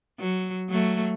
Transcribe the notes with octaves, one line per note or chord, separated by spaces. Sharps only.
F#3
F#3 A3